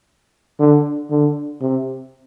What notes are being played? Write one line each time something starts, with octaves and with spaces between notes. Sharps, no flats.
D3
D3
C3